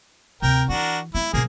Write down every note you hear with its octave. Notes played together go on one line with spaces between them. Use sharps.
D2 C3 A#4 G5
E3 D4 F#4 A#4
G#3 B3 E4
B2 F3 A#3 G#4